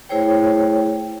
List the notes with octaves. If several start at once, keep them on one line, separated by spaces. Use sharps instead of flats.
A3 E4 G#4 C5 C#5 G5